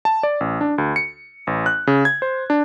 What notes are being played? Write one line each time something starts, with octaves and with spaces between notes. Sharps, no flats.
A5
D5
A1
D4
D2
C#7
A1
F#6
C#3
G#6
C5
D4